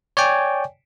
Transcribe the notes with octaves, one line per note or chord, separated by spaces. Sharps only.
C#5 D5 G5 G#5